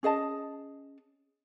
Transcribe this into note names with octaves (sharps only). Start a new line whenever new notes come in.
C#4 G#4 D#5 A5